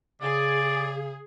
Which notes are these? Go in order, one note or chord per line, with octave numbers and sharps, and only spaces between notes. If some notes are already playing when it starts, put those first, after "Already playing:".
C#3 G#4 D5